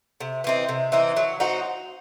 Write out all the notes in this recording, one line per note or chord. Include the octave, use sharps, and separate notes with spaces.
C3
E3 C4 D#4
C3
E3 C4 D#4
F#3
C4 D#4 F#4